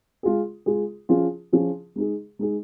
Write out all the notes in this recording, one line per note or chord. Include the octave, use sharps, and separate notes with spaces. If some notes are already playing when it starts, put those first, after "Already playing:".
G#3 F4 G#4
G#3 F4 G#4
F3 C#4 F4 G#4
F3 C#4 F4 G#4
G#3 D#4 G#4
G#3 D#4 G#4